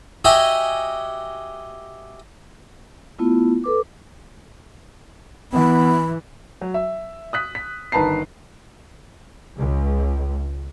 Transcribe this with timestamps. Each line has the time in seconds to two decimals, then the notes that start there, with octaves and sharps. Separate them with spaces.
0.25 F#4 G4 D#5 E5 G#5
3.19 A3 B3 E4 F4
3.64 A4 B4 D6
5.53 E3 B3 B5
6.61 F#3
6.74 E5
7.33 D#6 F#6 B6
7.55 B6
7.92 G1 D#3 B4 A5 A#5 C7
9.56 C#2